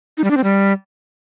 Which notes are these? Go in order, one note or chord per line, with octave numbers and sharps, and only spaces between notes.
D#4
G3
D4
C4
G3